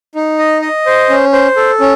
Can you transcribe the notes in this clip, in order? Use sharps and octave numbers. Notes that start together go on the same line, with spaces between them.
D#4
D#5
D#5
C5
C#4
C5
A4
C#4